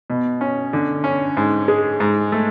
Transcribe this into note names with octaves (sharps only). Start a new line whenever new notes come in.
B2
C#4
D3
C#4
G#2
G#3
G#2
A3